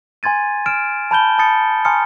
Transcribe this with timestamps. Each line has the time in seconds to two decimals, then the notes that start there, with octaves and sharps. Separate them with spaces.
0.23 G#5 C6 G#6 A6 D#7
0.66 F6 D7 E7
1.11 A5 B5 G6 G7
1.38 A5 B5 D#6 A6 C#7
1.85 G#5 A#5 C6 D#6 F6 C#7